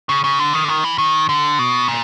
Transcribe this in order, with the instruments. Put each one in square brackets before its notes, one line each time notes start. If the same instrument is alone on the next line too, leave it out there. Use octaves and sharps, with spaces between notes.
[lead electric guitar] C#3
C#3
D3
D#3
D3
D#3
E3
D#3
D3
B2
A#2